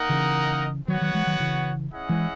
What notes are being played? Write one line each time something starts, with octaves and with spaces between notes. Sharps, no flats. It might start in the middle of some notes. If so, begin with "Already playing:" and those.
Already playing: A#3 D#4 A#4 D#5 F#5
C#3 E3
D#3 F#3 B3 F#4 C#5 F#5
D#3 F#3
E3 G#3
D#3 F#3
C#3 E3
C#4 E4 G#4 D#5 F#5
E3 G#3